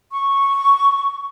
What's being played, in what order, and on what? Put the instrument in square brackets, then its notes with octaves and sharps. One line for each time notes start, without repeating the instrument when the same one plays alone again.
[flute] C#6